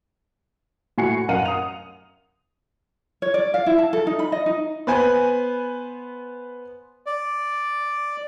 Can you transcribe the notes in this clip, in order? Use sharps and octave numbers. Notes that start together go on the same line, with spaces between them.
A2 F#4 G#5 C7 C#7
F#2 A#4 F5 F#5 D#7
D#6 F7
C#5
D5
F5
E4
A5
A4
D#4
B5
D#5
D#4
B3 B4 C5 G#5
D5